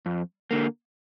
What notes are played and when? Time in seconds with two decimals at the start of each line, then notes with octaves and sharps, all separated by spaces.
0.06 F2
0.51 D3 A#3